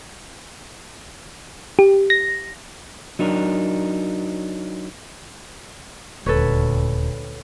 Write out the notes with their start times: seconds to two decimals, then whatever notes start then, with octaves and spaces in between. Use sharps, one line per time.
1.79 G4
2.10 A#6
3.19 F#3 D4 D#4 A#4
6.26 D#1 D2 A#2 A4 B4 C#5